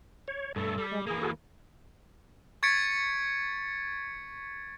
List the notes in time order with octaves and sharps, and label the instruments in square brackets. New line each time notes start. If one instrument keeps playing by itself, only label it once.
[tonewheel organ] C#5
[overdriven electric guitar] G2 A3 [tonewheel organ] A4
[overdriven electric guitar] G3
[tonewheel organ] G#3
[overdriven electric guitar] E3 A#3 [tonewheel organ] G#4
[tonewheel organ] F#4 G#4 A4
[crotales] C#6 G#6 A6 B6 C#7 D7